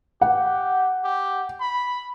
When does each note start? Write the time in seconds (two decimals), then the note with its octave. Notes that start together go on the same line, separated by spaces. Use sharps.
0.21 G4 F#5
1.04 G4
1.61 B5